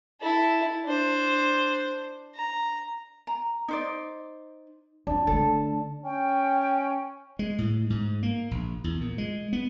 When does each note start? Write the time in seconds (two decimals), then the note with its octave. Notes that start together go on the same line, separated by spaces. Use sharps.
0.22 E4 A4
0.85 D4 C5
2.35 A#5
3.27 A#5
3.68 D#4 C5 D5
5.07 F2 D4
5.27 D3 A3 A4
6.05 C#4 G5
7.39 G#3
7.58 A2
7.90 G#2
8.23 A#3
8.51 A#1
8.84 E2
9.01 A#2
9.18 G#3
9.53 B3